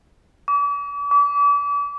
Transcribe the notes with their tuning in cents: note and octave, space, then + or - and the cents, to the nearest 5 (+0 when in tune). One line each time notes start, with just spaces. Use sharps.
D6 -40
D6 -35